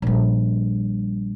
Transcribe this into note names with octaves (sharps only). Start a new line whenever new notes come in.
A#1 G3